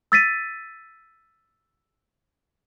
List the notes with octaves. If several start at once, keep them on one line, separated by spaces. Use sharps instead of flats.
E6 A6 B6 D#7